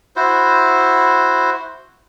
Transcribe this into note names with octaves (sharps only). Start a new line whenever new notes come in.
E4 F#4 C5